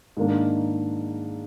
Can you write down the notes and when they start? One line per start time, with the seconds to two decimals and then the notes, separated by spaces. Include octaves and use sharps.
0.17 G#2 D#3 A#3 D4